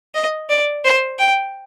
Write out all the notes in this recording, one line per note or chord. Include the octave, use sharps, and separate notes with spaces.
D#5
D5
C5
G5